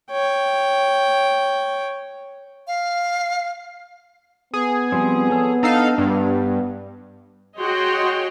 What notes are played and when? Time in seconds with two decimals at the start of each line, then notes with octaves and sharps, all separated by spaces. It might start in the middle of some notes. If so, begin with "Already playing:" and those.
0.11 C#5 G5
2.67 F5
4.54 B3 G#4
4.92 F3 G3 C4
5.30 A4 C#5 E6
5.63 D4 D#4 A4 B4 F5
5.98 G2 B3
7.61 F#4 G#4 C#5 D#5 G5 C6